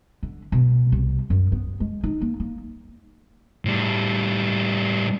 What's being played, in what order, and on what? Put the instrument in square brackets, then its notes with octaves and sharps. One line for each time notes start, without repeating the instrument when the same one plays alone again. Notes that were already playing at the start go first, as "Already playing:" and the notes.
[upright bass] D3
B2
C2
F#2
B3
G#3
D#4
A#3
A#3
[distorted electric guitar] A2 G3